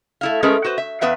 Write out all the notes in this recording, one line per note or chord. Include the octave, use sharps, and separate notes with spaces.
A3 E4 F5
G#3 A3 C#4 G#4 A#4 B4
F#4 B4 C5
E5
E2 B3 B4 E5 F5